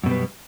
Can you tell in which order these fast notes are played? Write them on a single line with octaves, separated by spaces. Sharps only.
F#2 B2 G3 B3